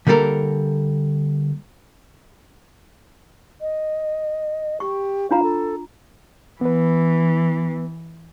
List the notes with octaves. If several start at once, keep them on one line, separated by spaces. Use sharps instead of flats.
D3 G3 A#3 A4 A#4
D#5
G4 C#6
D4 F4 F5 A#5
A4
E3 B3 B4